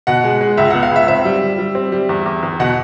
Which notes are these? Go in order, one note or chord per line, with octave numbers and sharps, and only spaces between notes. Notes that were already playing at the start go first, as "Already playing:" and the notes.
B2 F#5
G#3
G#3
C#2 E5
B3 F#5
F5
C#2 E5
C4 E5
G3
G3
G3
C4
G3
E2
E2
E2
B2 F#5